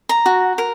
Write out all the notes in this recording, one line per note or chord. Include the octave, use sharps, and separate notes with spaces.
A#5
F#4
A#4